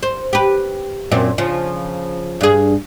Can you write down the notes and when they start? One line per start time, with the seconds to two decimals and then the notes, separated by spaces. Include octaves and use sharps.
0.03 C5
0.33 G4 B4
1.11 F#2 A#2 C4
1.38 C#3 F3
2.41 G2 G#4